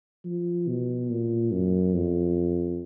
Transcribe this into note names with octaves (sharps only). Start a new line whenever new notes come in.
F3
B2
A#2
F#2
F2